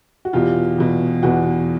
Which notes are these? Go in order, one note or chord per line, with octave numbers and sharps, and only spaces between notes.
F#4
E2 B2 F4 G4
E2 B2
E2 B2 F#4